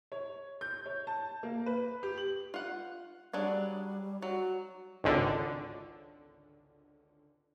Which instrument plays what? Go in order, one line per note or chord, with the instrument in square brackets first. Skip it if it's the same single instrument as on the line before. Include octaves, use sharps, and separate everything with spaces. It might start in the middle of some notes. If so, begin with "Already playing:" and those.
[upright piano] C#5
G6
C#5
A5
A#3
B4
G4
F#7
[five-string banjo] F4 F#5
[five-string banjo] F#3 D4 G#4 [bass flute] G3
[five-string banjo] F#3 [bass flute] F#4
[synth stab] G#1 C#2 D3